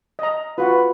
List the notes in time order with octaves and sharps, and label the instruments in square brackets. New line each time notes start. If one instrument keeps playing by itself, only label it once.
[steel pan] D#5 A#5
[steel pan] F4 F#4 F#5 [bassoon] B4